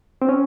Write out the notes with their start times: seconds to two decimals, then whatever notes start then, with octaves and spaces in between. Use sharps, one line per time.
0.22 C4
0.29 C#4